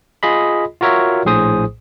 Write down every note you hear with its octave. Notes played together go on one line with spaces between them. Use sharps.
F4 G#4 D#5 B5
F4 F#4 A#4 C#5 E5
A#1 A2 G#4 C5 D#6